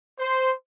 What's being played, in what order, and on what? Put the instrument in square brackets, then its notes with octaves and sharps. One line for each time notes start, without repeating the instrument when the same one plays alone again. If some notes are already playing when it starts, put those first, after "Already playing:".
[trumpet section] C5